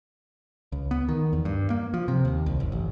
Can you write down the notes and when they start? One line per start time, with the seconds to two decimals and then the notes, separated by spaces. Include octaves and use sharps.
0.72 C#2
0.91 B3
1.09 D#3
1.33 E2
1.45 G2
1.70 A#3
1.94 F3
2.08 C3
2.25 D#2
2.46 C2
2.60 F#1
2.72 A1